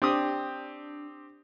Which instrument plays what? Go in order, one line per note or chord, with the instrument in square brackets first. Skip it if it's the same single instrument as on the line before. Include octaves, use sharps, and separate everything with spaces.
[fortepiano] C4 G4 D#6 [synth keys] D4